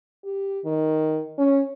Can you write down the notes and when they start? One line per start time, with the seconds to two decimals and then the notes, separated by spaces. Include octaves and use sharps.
0.24 G4
0.65 D#3
1.38 C#4